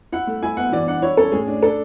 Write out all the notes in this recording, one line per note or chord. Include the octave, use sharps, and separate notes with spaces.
E4 F#5
A3
E4 G#5
B3 F#5
E3 D5
D4 F#5
E4 C#5
C#4 A4
A2 G#4
D4
D4 A4